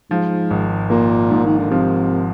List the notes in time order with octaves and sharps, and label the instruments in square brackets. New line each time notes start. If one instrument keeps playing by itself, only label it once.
[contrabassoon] G#2 [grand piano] F3
[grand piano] G#1
[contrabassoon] A#2 [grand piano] A#3
[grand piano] G#2
[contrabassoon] D#3
D3
[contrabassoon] C3 [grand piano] F3